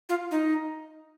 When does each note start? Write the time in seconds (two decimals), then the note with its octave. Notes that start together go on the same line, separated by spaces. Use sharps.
0.09 F4
0.31 D#4